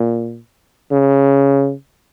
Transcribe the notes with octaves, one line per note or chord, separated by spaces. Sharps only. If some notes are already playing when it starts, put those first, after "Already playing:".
Already playing: A#2
C#3